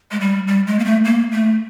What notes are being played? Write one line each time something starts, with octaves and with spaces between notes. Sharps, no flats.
G#3
G3
G3
G#3
A#3
A3
A#3
A3